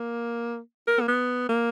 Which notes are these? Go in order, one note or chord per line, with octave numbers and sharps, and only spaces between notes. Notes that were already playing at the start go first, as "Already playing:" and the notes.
Already playing: A#3
A#4
A#3
B3
A#3